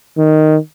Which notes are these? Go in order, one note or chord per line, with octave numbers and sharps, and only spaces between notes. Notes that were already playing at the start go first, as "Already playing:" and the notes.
D#3